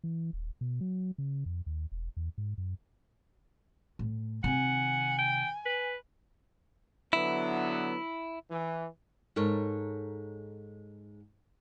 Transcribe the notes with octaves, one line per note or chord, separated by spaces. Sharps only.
E3
D#1
B2
F#3
C#3
F2
D#2
E1
E2
G#2
F#2
A2
C3 D#3 F#5 G#5
G5
B4
D3 F#3 B3 E4
E3
G#2 A4 A#4 C#5